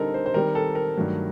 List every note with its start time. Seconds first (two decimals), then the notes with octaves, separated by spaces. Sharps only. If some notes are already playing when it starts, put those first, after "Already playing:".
Already playing: D3 G3 C4 D#4 A4 A#4
0.14 C5
0.26 C5
0.34 D#3 G3 C4 A#4
0.55 A4
0.75 A#4
0.97 G2 D#3 F#3 A3